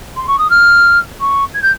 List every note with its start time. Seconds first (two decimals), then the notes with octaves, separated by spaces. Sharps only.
0.16 C6
0.27 C#6
0.38 D#6
0.50 F6
1.19 C#6
1.54 G#6
1.62 G6